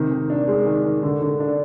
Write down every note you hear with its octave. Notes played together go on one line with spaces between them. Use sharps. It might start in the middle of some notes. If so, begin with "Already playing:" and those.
Already playing: C3 D#3
D#3
D4
G#3
D#3
D#3
D3
D3
D4